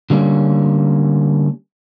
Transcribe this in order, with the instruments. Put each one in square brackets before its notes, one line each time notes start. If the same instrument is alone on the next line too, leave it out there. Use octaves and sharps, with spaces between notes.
[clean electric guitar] D3 G3 A#3 C#4